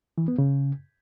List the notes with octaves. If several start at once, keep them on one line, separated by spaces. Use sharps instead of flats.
E3
B3
C#3